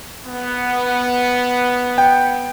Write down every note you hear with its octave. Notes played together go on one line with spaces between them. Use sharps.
B3
G5